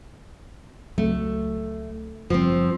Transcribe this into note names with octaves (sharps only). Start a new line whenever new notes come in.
C#2 F#3 A3 C4
F#1 F3 G3 C4